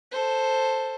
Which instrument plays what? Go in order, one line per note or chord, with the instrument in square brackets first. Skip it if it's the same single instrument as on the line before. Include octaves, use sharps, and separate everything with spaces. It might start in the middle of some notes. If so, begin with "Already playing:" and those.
[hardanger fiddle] A4 C5